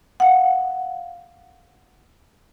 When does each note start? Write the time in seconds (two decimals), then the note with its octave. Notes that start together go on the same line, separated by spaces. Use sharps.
0.20 F5 F#5